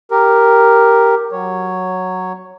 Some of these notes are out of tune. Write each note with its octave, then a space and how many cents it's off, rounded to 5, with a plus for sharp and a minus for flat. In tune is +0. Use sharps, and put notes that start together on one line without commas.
G4 +5 A#4 +0
F#3 +0 C#5 +0